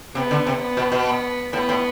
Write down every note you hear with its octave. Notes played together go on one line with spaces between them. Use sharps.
C3 B3
D3
C3
B3
B2
B2
B3
A2 B3
A2